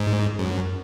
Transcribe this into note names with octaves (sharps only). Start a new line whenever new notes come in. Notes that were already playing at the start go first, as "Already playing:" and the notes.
Already playing: G#2
F#2